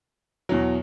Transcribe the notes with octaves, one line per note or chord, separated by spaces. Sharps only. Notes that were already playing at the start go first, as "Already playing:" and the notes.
E2 B2 F#3